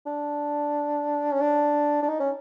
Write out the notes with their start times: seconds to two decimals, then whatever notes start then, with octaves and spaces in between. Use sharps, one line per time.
0.06 D4
1.32 C#4
1.41 D4
2.03 D4
2.08 D#4
2.20 C#4